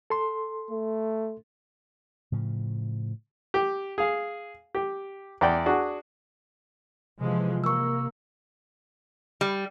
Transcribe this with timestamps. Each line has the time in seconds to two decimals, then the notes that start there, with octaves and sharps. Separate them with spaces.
0.10 A4 C6
0.71 A3
2.32 A2 C#3 F3
3.54 G4
3.98 G#4 F5
4.75 G4
5.41 E2 D5 G5
5.66 D4 F#4 G#4
7.20 C3 E3 F3 G#3
7.64 A#3 C#6 E6
9.41 G3